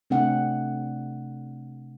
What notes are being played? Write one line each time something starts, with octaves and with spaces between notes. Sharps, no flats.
C3 A3 C4 D4 F#5